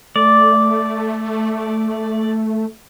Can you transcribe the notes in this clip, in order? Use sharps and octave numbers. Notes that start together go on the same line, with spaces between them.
A3 D5